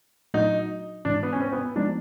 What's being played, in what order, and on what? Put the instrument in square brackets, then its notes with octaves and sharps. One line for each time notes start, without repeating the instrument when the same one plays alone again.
[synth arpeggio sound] A#2 F#3 A3 D4 F#4 [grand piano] D#4
[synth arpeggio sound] G#2 E3 G#3 [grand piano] D4
[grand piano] B3
C#4
C4
B3
[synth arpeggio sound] F3 G#3 B3 D#4 [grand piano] D4